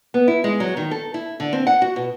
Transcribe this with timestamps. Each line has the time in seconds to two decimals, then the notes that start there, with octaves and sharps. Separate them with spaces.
0.14 B3
0.28 E4
0.44 G#3
0.60 F#3
0.77 D#3
0.91 A4
1.14 E4
1.40 D3
1.53 C4
1.67 F#5
1.82 F#4
1.96 B2